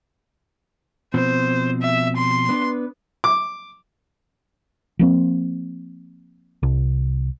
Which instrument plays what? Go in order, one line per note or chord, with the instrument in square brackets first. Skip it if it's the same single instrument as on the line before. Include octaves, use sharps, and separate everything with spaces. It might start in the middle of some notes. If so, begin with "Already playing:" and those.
[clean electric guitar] B2 F3 C4 [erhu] C5
[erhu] E5
C6
[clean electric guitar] B3 D4 B4
[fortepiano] D6
[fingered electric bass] F3 A#3 C4
[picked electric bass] C2